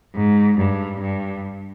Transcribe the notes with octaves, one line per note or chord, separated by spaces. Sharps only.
G#2
G2
G2